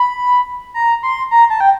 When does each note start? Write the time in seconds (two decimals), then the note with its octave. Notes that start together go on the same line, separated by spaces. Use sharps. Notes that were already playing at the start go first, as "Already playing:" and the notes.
Already playing: B5
0.74 A#5
1.03 C6
1.31 A#5
1.50 A5
1.60 G5